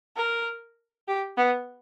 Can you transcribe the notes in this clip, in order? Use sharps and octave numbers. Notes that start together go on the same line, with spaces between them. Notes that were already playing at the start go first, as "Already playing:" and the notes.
A#4
G4
B3